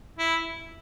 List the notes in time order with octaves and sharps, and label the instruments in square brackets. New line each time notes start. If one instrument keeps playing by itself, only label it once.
[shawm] E4